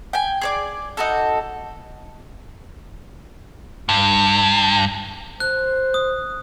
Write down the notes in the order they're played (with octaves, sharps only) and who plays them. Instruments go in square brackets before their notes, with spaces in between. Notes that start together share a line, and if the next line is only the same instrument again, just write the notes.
[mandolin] G5 G#5
G#4 C#5 D5
D#4 F#4 A4
[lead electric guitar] G2
[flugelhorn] C5 [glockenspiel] F#6
[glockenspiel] D#6